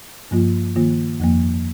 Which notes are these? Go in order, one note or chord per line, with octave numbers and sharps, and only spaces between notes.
G2 F3 A#3 F4
D#3 A#3 F4
F2 F3 A#3